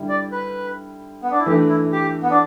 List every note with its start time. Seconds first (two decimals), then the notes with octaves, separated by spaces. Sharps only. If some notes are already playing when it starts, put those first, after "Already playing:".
Already playing: D3 G3 E4
0.09 D5
0.32 B4
1.23 B3
1.32 D4
1.39 E4
1.46 E3 A3 D4 G4
1.69 E4
1.92 G4
2.23 B3
2.31 D4